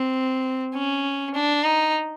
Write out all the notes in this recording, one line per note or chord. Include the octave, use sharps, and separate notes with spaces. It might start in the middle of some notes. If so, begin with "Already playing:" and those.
Already playing: C4
C#4
D4
D#4